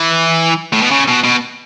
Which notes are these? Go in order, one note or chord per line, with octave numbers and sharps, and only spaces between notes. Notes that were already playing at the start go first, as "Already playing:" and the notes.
Already playing: E3
A2
B2
C#3
B2
B2